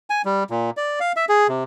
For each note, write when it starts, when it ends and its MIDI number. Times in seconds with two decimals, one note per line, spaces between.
0.10 0.22 80
0.25 0.44 55
0.50 0.70 46
0.77 0.99 74
1.00 1.12 77
1.16 1.25 76
1.29 1.47 68
1.49 1.64 48